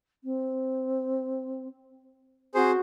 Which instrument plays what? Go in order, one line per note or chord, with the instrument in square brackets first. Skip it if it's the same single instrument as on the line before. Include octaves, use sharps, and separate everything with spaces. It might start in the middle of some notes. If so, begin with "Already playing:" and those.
[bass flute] C4
[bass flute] C4 [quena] F#4 [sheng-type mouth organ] G#4 C5